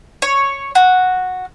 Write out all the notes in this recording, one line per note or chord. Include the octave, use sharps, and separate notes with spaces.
C#5
F#4